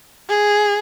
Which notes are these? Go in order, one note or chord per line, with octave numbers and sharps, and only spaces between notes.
G#4